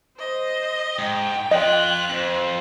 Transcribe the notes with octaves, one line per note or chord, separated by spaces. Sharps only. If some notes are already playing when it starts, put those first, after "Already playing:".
C5 D#5
G#2 G5
F2 F4 D#5 F#6
F2 C5